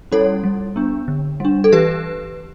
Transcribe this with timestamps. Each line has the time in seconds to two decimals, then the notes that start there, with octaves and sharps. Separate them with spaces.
0.12 G3 C#4 E4 A4 C#5
0.44 G3
0.76 B3 D4
1.08 D3
1.40 G3 D4
1.64 A4
1.72 E3 G4 B4